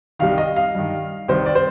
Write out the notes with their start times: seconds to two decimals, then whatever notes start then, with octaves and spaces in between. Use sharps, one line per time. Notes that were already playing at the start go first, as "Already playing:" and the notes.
0.19 C2 C3 D#3 F5
0.38 D#5
0.56 F5
0.75 G2 D#3
1.28 C2 C3 D#3 C5
1.46 D5
1.55 C5